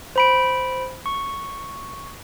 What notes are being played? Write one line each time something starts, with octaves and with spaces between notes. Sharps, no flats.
C5 B5 D7
C#6